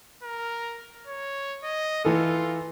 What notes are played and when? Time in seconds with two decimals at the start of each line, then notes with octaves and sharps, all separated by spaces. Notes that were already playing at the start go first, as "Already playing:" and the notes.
0.23 A#4
1.07 C#5
1.64 D#5
2.05 E3 F4 A4